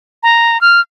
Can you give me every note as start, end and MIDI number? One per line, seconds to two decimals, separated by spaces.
0.23 0.60 82
0.61 0.81 89